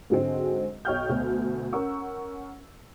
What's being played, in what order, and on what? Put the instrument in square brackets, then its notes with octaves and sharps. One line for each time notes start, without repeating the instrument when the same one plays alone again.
[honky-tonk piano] G#2 D3 F#3 G#3 C4
B1 C#5 D#5 G5 F6 G6
D2 B2
C#4 A#4 F#5 C#6 E6